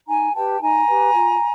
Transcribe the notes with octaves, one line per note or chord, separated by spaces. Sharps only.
D#4 G#5 A#5
G4 B4 G5 A5
D#4 G#5 A#5
G4 B4
F4